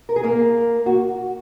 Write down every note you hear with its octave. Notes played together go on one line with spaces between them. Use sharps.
A#4
G#4
A#3 A#4
F#4